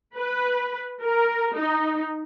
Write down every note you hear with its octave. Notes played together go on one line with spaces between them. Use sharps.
B4
A#4
D#4